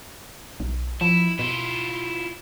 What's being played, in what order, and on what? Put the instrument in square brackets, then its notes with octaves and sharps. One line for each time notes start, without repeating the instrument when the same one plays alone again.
[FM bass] B1
[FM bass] F3 [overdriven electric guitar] E4
[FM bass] B2 [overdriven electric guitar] E4 F4